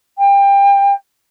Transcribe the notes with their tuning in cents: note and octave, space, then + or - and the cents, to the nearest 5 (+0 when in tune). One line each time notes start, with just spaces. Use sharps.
G5 +25